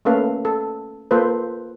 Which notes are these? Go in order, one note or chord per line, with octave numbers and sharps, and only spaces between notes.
A3 A#3 C#4 A4 B4 F5
A4
A#3 F4 A4 B4 C5